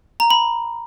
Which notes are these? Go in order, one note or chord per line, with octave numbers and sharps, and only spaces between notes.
A#5
B5